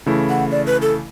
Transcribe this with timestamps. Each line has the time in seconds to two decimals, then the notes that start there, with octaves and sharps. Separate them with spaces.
0.06 C#3 E3 A3 E4
0.29 F#5
0.51 D5
0.66 B4
0.82 A4